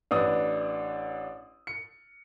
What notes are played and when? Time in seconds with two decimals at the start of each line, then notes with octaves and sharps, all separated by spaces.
0.11 A1 D4 B4 D#6 E6
1.67 C#7